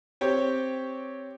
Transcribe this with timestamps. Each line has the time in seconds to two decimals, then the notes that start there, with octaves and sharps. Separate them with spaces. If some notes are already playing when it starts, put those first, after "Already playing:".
0.21 C4 G4 C#5